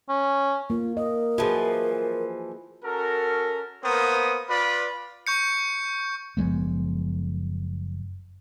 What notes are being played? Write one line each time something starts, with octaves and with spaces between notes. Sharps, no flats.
C#4
A#3 F4
A#4 D#5
E3 F3 F#4 G#4
C#4 F#4 A4 A#4
A#3 B3 A#4 C5 D#6
F4 B4 D5 B5
C#6 G6 C#7
F#1 F3 G#3 B3